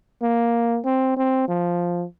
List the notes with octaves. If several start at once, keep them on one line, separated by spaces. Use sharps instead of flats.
A#3
C4
C4
F3